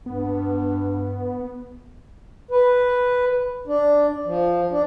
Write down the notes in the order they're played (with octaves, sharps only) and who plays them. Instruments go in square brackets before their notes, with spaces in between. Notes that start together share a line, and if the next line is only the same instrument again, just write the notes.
[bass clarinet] G2 [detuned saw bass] B3
[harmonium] B4
D4
F3
D4